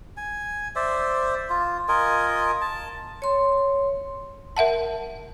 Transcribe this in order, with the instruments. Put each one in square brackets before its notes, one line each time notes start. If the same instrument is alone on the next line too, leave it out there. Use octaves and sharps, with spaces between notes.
[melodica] G#5
C5 D5 E5
F4
F4 A#4 D#5 G#5
A5
[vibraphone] C#5 C6
[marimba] A#4 E5 F#5 A5